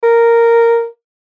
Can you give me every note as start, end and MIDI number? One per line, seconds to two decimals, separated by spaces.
0.03 0.86 70